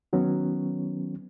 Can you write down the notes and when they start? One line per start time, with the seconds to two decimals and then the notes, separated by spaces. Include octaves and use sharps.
0.13 D#3 F#3 B3 C#4